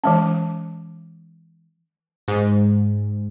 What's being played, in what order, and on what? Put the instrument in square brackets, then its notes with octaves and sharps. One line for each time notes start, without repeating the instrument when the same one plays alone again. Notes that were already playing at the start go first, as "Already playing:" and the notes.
[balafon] E3 G#3 C#4
[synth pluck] G#2